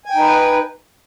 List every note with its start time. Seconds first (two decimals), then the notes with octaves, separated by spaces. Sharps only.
0.05 G#5
0.10 G5
0.15 D#4
0.20 B4